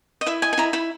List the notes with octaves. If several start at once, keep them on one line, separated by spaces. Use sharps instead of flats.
D#5
E4 E5
D#5 G#5
G#5
E4 A#5
E4 B5